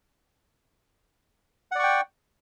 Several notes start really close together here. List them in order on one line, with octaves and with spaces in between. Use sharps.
F#5 D5 C#6 G5